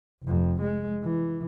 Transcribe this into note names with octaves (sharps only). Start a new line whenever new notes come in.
F1 F2
G#3
E3